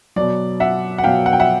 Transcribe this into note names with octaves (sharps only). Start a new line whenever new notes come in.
B2 F#3 D5
E5 F#5
F#5
B2 F#3 F5 G5
F#5
G5
E5 F#5